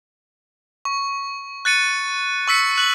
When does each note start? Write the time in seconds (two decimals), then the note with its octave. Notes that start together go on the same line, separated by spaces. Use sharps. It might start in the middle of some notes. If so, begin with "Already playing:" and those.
0.85 C#6
1.65 F#6 A6 C#7 D#7
2.48 C#6 E6 B6 C#7
2.78 F#6 F#7